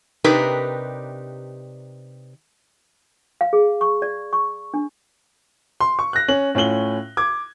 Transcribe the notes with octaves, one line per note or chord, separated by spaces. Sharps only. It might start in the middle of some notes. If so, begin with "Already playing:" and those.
C3 D4 D#4 G4 A#4 B4
F5
G#4
C#6
D5
C#6
D4
C6
C#6
F#6 A#6
C#4 F#7
A2 C#4 F4 F#7 G7
D6 G#6